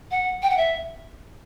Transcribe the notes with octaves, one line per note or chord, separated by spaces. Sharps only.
F#5
G5
F#5
E5